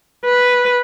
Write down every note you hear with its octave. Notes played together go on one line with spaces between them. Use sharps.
B4